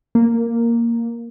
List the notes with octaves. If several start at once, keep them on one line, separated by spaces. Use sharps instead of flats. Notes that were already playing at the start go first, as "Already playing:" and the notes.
A#3